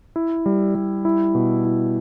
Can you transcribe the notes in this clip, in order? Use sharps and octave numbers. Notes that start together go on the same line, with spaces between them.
E4
G3
G3
E4
B2
E4